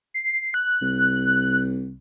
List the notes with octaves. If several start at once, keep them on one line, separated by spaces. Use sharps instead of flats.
C7
F#6
C2